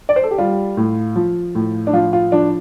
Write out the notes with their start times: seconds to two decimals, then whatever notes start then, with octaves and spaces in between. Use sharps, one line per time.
0.09 D5
0.16 C5
0.24 A4
0.31 G4
0.38 G3 F4
0.77 A2
1.16 F3
1.55 A2
1.87 D4
1.93 F3 F4
2.13 F4
2.32 F3 D4